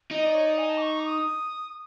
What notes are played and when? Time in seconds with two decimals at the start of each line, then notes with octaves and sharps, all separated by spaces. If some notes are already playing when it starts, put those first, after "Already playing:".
0.11 D#4
0.18 D#5
0.26 D5
0.34 C#5
0.46 D5
0.58 G#5
0.69 A5
0.77 D6
0.82 C#6
1.00 D6
1.05 D#6